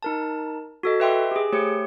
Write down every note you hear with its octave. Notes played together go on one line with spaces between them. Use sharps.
D#4 A#4 A5
F#4 A4 D#5
B4 D#5 E5 G5 C6 D6
G4 G#4
A3 G4 C5 C#5 C#7